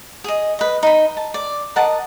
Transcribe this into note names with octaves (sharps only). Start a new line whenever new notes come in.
G#4 D#5
B4 D#5
D#4 B5
A5
D5
A#4 D#5 F#5 A5